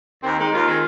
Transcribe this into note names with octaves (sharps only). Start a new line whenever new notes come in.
D#2 C4
D#3 G#3 C4 D#4
D#2 F4
D#3 G#3 C4